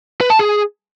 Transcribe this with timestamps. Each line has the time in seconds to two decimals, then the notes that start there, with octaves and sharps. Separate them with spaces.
0.21 B4
0.30 A5
0.39 G#4